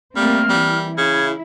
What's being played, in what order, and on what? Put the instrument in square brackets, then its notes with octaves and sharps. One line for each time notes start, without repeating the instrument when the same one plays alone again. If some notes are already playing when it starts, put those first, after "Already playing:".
[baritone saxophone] G3 [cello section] A3 A#3 C4 [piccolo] F6
[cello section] E3 [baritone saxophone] G3
[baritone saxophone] C#3 [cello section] E4 [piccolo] G#6